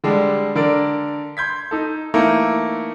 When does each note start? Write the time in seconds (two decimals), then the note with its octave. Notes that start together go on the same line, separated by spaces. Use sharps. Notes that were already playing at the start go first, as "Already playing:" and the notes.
0.04 D3 G3 G#3 D4
0.55 D3 A#4 D5
1.37 C6 G6 G#6 B6
1.71 D#4 A4
2.14 E3 A3 A#3 D#4